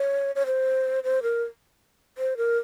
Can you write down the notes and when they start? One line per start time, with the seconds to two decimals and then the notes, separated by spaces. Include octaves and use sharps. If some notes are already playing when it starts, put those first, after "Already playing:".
Already playing: C#5
0.35 C#5
0.46 C5
1.04 C5
1.23 A#4
2.18 C5
2.37 A#4